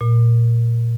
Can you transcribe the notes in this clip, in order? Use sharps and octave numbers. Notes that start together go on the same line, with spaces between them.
A#2